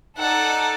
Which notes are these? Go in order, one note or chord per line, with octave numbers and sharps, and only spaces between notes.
D#4 A4 D5 F#5